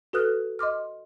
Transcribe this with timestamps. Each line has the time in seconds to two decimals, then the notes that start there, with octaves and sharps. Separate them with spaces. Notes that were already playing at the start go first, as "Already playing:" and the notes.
0.13 F#4 A4 B4 D#6 F6 F#6
0.59 D#5 C6 D6 F6